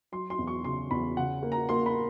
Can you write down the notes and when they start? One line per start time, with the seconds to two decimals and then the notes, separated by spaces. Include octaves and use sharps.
0.12 F#3 C6
0.30 C6
0.39 E2
0.47 C#6
0.64 C#3 C6
0.91 E2 B5
1.17 C#3 F#5
1.43 A#3
1.52 A#5
1.69 A#3 C6
1.86 B5